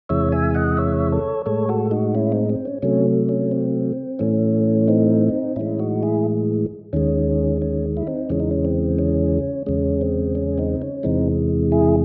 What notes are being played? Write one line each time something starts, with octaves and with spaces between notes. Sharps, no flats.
E2 C3 E3 G#3 C#5 E5
E5 G#5
D#5 F#5
C#5 E5
A4 C#5
A2 G#3 A4 C#5
F#4 A4
D#4 F#4
C#4 E4
C4 D#4
C4
C#4
C3 F#3 A3 C#4
C#4
C4
A2 E3 A3 C#4
C4 D#4
A2 E3 G#3 C#4 E4
D#4 F#4
E4 G#4
D#2 D#3 G#3 C#4
C#4
E4
C4 D#4
E2 C#3 E3 G#3 C#4
D#4
C#4
C4
C#4
E2 C#3 G#3 C#4
C4
C#4
C4 D#4
C#4
E2 C3 E3 G#3 C4 D#4
E4 G#4